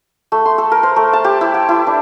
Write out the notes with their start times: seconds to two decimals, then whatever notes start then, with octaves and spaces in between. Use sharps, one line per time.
0.32 A3
0.45 C6
0.58 A4
0.72 A#4
0.83 C5
0.96 A3
1.13 A5
1.24 G4
1.41 E4
1.54 G5
1.69 E4
1.87 D4